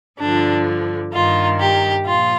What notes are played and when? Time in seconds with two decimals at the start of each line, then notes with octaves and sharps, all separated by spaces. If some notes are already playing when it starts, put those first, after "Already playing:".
0.20 G2 D3 F3 D4
1.14 G2 D#3 F4
1.59 G4
2.06 A#2 F3 F4